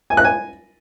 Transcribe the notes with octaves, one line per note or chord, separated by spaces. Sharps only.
G#5
F#6
G#5